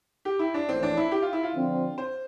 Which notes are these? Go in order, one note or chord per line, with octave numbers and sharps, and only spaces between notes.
G4
E4
D4
A#1 A2 E3 C4
D4
E4
G4
F4
E4
F4
D3 F3 C4
C5